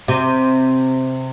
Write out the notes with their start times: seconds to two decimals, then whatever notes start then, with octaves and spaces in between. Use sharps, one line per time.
0.08 C3